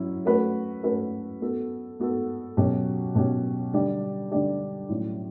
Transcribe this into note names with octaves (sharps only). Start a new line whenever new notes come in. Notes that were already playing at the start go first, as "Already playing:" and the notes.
Already playing: F#3 C#4 E4
A3 C#4 F#4 B4
A3 C#4 F#4 B4
B3 F#4 A4
B3 F#4 A4
B2 F#3 C#4 G4
B2 F#3 C#4 G4
D3 G3 D4 G4
D3 G3 D4 G4
A2 F#3 C#4